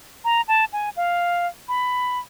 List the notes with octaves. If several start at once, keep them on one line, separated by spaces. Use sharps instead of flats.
A#5
A5
G#5
F5
B5